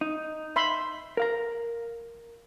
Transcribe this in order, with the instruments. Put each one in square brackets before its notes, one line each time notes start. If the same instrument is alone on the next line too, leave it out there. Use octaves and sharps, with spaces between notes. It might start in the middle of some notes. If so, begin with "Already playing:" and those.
[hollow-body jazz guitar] D#4
[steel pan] E5 B5 C6
[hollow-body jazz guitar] A#4 F5 A#5